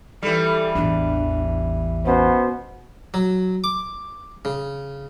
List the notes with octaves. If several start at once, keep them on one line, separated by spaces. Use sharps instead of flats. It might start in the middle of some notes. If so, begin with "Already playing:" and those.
E3 G3 A4
A1 E2 D4
B2 B3 C#4 C5
F#3
D6
C#3